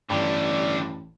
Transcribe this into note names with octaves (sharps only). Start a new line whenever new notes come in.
A1 G2 D3 G3 D5